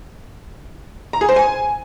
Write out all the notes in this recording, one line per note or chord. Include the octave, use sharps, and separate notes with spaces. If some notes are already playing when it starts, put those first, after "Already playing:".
A#5
G#4
C5
G#5